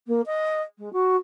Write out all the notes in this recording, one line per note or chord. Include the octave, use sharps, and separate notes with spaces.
A#3
D#5
G#3
F#4